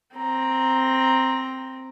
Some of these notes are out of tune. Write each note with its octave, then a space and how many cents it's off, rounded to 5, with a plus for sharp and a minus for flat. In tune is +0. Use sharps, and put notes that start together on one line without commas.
C4 +0 A#5 +0